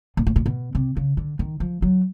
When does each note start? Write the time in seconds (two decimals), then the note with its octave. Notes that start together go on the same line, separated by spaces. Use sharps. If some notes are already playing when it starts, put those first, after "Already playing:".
0.17 A#2
0.27 A2
0.36 A#2
0.46 B2
0.75 C3
0.97 C#3
1.17 D3
1.39 D#3
1.60 F3
1.82 F#3